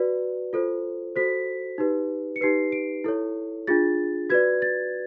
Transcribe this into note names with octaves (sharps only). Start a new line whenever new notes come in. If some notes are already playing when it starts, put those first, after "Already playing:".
Already playing: F#4 B4 D5
F4 A4 C5
F#4 A4 C5 B6
D#4 G4 B4
C#7
D#4 G4 B4 C7
D7
E4 A4 C#5
D4 F4 G#4 A6
F#4 B4 D5 G#6
A6